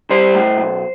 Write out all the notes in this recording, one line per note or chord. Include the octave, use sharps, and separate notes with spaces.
G3 C5
A2
B1